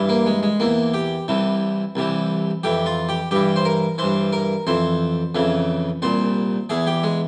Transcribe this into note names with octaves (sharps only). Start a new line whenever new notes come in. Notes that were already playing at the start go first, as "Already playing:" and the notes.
Already playing: G2 E3
A#3
G#3
G#3
E2 E3 A#3
G4
C2 C3 E3
C2 C3 E3
F2 E3 G4
F4
G4
G2 E3 G4
C5
A#4
G2 E3 C5
A#4
F2 E3 C5
F2 C#3 E3
C2 A#2 C5
E2 E3 G#4
G4
G#3